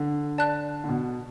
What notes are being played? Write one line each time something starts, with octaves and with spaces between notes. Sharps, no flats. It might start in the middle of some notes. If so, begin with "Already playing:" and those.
Already playing: D3
D5 A5 F#6
D3
B2